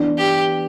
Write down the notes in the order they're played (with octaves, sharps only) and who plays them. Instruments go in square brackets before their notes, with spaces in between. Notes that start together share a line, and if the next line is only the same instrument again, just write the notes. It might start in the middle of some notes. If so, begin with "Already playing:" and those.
Already playing: [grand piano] E3 B3 D4
[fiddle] G4